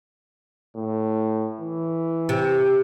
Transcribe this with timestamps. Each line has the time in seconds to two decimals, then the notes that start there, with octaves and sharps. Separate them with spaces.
0.76 A2
1.61 E3
2.29 C3